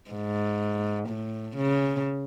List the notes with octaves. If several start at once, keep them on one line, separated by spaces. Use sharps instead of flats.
G#2
A2
C#3